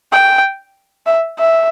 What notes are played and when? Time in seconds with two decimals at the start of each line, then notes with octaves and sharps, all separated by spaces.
0.12 G5
1.06 E5
1.39 E5